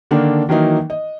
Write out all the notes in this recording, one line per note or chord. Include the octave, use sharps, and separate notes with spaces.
D3 D#3 A#3 D4
D#3 E3 F#3 A#3 D#4
D#5